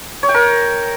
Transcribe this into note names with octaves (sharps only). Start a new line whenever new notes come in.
C#5
G5
A#4